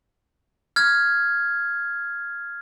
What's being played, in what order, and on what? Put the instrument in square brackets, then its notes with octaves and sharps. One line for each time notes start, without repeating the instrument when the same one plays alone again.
[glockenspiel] F6 G#6